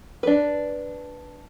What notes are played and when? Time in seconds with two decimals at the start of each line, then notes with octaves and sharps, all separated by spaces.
0.23 D4 B4